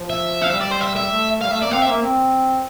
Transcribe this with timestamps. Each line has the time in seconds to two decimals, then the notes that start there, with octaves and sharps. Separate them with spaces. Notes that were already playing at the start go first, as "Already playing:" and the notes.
Already playing: F3
0.10 E5
0.42 F5
0.50 G3 E5
0.61 D5
0.71 C5
0.80 E5
0.96 E5
1.11 A3
1.41 G3 F5
1.51 A3 E5
1.62 A#3 D5
1.71 C4 F5
1.82 E5
1.87 A#3
2.02 C4